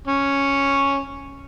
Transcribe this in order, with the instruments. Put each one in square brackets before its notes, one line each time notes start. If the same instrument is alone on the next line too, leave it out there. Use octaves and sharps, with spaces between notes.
[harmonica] C#4